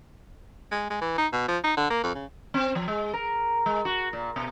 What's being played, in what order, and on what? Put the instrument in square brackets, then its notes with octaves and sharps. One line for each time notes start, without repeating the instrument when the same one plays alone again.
[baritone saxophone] G#3
G#3
E3
D#4
B2
F3
D#4
D3
A#3
F2
C#3
[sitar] C4
F3
G#3
A#4
G#3
F#4
A#2
B2